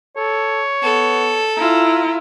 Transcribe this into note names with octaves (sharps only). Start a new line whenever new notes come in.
A4 C#5
B3 A4
E4 F4 A#5